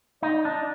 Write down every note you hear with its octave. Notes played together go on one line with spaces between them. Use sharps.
D#4 D5
D4